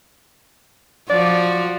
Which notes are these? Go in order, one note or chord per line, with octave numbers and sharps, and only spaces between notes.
F3 F#4 D5